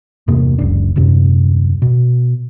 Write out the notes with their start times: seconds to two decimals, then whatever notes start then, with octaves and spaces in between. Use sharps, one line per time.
0.28 E2 G2 C3 A#3
0.58 F#1 C#2 D4
0.96 D#1 F#2 C3
1.82 B2